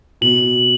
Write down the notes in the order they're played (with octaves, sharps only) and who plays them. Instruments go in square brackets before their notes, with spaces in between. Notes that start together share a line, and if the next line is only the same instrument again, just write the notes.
[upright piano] B2 [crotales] F#7